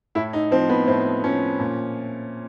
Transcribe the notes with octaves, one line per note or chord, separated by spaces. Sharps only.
A2 E4
D#4
F3 C4
B3
A2 C4
F3 C#4
A#2